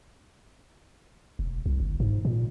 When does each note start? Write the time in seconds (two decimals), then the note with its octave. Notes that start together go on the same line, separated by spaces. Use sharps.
1.39 E1
1.66 C2
1.80 G1
2.00 G#2
2.25 A#2